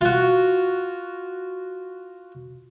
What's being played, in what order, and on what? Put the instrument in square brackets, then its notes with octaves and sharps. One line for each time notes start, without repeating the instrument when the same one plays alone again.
[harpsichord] F4 F#4